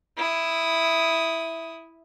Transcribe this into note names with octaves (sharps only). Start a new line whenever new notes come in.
E4 D#6